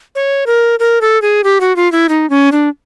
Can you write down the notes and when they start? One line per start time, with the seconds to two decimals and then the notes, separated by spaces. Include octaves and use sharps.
0.15 C#5
0.47 A#4
0.79 A#4
1.01 A4
1.22 G#4
1.44 G4
1.61 F#4
1.76 F4
1.92 E4
2.09 D#4
2.30 C#4
2.52 D4